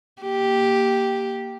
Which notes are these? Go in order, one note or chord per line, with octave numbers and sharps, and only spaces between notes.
A#3 G4